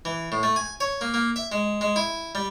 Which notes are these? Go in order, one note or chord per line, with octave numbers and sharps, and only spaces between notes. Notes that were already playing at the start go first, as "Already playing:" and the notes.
E3
A2
A3
G#5
C#5
A#3
A#3
E5
G#3
G#3
E4
G3